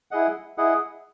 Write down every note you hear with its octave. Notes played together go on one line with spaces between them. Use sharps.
E4 G#4 D#5 F#5
E4 G#4 D#5 F#5